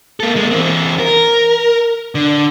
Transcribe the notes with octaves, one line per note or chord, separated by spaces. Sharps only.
A#3 A4
G#3 A#3
E3 C4
A#4
D3